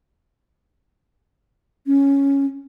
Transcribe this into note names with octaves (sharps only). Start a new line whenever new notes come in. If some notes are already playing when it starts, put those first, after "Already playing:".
C#4